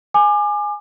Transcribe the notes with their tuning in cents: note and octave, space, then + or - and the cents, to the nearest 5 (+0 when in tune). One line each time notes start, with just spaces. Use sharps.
G#5 +0 D6 +35